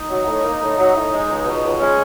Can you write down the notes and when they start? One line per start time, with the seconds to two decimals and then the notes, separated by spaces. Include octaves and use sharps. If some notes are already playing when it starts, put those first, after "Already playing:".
Already playing: D#4
0.09 F#3
0.26 A2
0.43 A#3
0.60 A2
0.77 F#3
0.94 A2
1.11 G#3
1.28 C#2
1.46 B2
1.63 C#2
1.80 G#3 C#4